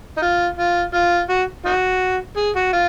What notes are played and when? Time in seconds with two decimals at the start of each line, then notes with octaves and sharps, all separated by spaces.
0.18 D#4
0.22 F4
0.57 F4
0.94 F4
1.29 F#4
1.66 D#4 F#4
2.37 G#4
2.56 F#4
2.73 F4